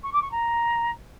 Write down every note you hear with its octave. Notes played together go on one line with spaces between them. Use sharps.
C#6
D6
C#6
A#5